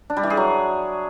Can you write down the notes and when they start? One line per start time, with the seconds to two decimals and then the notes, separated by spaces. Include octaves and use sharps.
0.10 D4
0.17 G3
0.23 E3
0.30 G#4
0.37 F#3